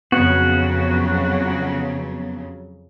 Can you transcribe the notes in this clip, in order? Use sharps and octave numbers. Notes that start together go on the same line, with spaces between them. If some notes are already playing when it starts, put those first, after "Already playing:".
F2 C#3 F#3 B3 F#4